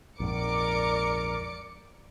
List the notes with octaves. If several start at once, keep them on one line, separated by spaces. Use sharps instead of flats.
A#1 F2 G#2 A#4 D5 D6 C#7